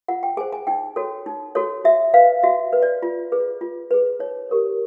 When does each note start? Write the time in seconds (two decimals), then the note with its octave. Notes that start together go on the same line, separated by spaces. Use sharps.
0.08 F4 F#5
0.23 G5
0.37 G#4 G#5
0.41 C5
0.53 G#5
0.67 D#4 G5
0.96 F#4 A4 C#5
1.26 D#4
1.55 F#4 A4 C#5
1.84 F#4 E5
2.14 B4 F5
2.43 F#4 E5
2.73 B4
2.82 D5
3.03 F4
3.32 G#4 B4
3.61 F4
3.91 G#4 B4
4.19 D#4 C#5
4.49 G4 A#4 C#5